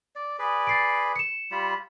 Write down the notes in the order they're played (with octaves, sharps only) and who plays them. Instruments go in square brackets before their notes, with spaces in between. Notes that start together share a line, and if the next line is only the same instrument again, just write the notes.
[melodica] D5
G#4 B4 D5
[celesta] A6 C7 D7
C#7 E7
[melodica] G3 F4 B5